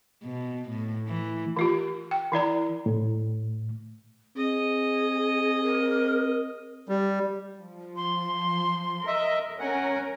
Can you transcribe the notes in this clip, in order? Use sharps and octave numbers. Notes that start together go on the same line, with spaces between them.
B2
A2
E3
E3 F4 G4
G5
E3 E4 D5 A#5
A2
C4 G#4 D#5
A#4
G3
F3
C6
A#4 D#5 E5
C#4 A#4 F#5 G#5